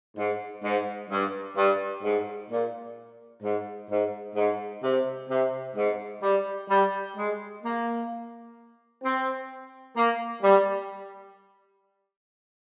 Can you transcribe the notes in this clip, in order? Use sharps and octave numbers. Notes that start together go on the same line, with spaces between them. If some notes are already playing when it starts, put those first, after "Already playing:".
G#2
G#2
G2
G2
G#2
A#2
G#2
G#2
G#2
C3
C3
G#2
G3
G3
G#3
A#3
C4
A#3
G3